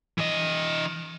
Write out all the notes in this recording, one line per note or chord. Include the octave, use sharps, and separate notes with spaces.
E3 D#5